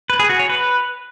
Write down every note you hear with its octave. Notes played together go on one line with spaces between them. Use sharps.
B4
G#4
F#4
C#5
B4